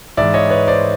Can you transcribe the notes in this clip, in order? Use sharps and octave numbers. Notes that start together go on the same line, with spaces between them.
G#2 E3 D5 E5
C#5 D#5
B4 C#5
C5 D5